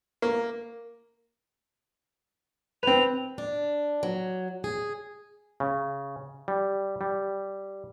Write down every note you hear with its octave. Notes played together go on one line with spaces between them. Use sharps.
A#3
C4 B4 F7
D4
F#3
G#4
C#3
G3
G3